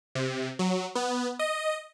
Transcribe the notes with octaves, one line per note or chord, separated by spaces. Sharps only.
C3
F#3
B3
D#5